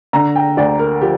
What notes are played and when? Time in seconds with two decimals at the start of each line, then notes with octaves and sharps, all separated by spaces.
0.13 D3 A#5
0.36 G5
0.57 D2 D5
0.79 A#4
1.01 F3 G4